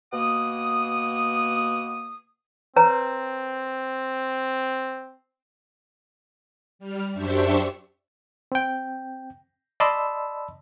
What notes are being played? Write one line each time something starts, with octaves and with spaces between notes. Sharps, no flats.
B2 A#3 F#5 D#6
C4 B4 C#5 A#5
G3 F6
F#2 D4 G4 C5 E5 C#6
C4 G5
D5 D#5 A5 B5 C6 E6